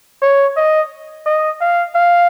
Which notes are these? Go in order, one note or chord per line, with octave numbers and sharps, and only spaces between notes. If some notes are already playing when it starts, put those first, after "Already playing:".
C#5
D#5
D#5
F5
F5